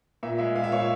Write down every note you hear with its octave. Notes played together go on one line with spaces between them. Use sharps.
A#2 E5
G#3 E5
A#2 F5
E5
A#2 C#5
E5